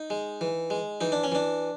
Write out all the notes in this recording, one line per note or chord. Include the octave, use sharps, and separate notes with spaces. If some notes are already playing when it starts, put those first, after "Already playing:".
Already playing: D#4
G#3
E3
G#3
E3 D#4
D4
C#4
E3 D4